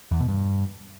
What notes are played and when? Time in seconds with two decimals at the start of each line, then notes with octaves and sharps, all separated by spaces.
0.11 E2
0.20 B2
0.28 G2